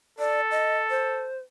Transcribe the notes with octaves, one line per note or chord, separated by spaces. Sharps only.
A4 D5
D#5
C5